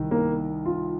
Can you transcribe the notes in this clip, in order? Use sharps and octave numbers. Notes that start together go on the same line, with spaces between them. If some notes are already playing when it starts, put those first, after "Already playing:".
Already playing: C2 D#3
A#3
F4